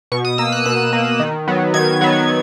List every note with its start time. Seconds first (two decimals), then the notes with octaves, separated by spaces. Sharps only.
0.12 B2 C#6
0.25 D#6
0.38 A#3 E6
0.52 F#6
0.65 B2 F#6
0.93 A#3
1.20 D#3
1.48 F#3 B3
1.74 D#3 G#6
2.01 F#3 B3